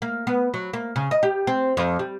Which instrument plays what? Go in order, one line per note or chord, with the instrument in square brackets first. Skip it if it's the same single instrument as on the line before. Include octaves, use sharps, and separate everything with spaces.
[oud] A#3
B3
F#3
A#3
C#3
D#5
G4
C4
F2
G3